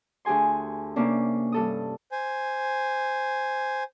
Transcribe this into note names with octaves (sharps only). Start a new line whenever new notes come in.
D2 G4 G#4 G#5 C6
C3 A#3 C#4 D4
G2 A4 D#6
C5 G#5